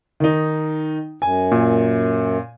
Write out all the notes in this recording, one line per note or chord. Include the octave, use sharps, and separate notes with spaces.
D#3 D#4
F#2 G#5
A#2